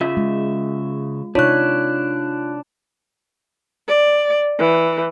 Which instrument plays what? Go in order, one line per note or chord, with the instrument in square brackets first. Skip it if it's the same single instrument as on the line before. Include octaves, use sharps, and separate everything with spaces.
[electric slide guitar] C#3 E5 [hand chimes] F4
[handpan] G#3
[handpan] C3 D#4 C#5 [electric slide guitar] D4 [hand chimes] F4 F#6
[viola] D5
E3